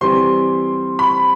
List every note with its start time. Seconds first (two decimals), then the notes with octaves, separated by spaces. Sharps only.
0.01 E3 G3 C4 G4 C5 C6
0.99 B5